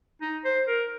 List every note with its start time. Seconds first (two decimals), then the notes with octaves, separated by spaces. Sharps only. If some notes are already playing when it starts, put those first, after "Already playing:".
0.22 D#4
0.45 C5
0.68 A#4